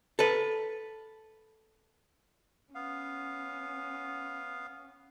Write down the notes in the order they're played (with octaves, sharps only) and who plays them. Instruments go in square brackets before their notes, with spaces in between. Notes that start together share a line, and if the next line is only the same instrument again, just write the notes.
[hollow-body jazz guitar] A4 B4
[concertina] B3 F5 [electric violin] C#4